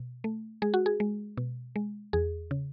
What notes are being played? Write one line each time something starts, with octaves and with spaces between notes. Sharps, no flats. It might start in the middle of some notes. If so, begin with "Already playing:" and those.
Already playing: B2
A3
G#3 G#4
F#4
G#4
G#3
B2
G#3
E2 G#4
C#3